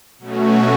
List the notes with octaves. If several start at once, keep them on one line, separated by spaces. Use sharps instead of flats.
B2 F#3 A3 C#4 F#4